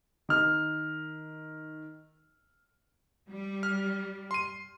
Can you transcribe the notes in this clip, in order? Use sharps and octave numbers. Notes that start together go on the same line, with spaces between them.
D#3 F6
G3
F6
C6 D#7